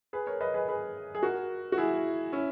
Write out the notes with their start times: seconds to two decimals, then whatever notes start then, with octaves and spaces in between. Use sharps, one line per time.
0.13 G#4 B4
0.27 A#4 C#5
0.41 B4 D#5
0.54 G#4 B4
0.68 G#4 B4
1.15 G#4
1.23 F#4 A#4
1.72 F#4
1.77 E4 G#4
2.33 C#4 E4